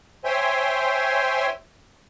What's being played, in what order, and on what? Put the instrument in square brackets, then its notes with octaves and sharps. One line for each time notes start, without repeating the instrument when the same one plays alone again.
[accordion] C5 C#5 E5 G5 G#5 C6